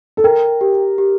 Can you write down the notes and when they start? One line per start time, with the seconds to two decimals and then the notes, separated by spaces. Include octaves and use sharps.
0.17 A4
0.24 A#4 G5
0.61 G4
0.98 G4